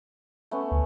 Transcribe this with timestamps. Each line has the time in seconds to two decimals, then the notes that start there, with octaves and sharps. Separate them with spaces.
0.51 A3 B3 C#4
0.71 D2